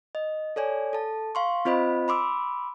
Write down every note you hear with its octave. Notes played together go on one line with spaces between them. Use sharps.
D#5
A4 C#5 D5 G#5
A4 A5
F5 C6 C#6
C4 F4 C5 D#5 B5
B5 C6 D6 E6